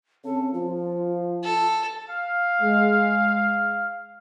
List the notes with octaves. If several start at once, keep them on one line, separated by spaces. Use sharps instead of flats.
C#3 C4 C#4 A4
F3 F4
A4
F5
G#3